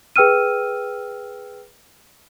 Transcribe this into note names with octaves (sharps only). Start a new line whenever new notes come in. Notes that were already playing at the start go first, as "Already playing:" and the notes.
G#4 B4 G5 E6 F6 D#7